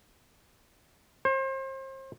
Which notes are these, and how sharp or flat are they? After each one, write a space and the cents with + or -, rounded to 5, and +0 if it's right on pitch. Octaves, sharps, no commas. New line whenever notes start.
C5 +35